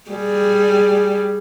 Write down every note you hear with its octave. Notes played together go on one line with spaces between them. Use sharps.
G3 G#4